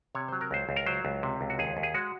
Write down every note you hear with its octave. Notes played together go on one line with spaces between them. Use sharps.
C3 C#5
F#3 C5
A#4
C#2 C5
C#2
A#4
F#3 C5
C#2
C3
C#2
F#4
D#2 G#4
D#2
G#4
G#3 F#4